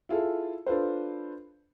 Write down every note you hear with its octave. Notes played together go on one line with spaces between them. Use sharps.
E4 F4 G#4 A4
D4 F4 A4 B4 C5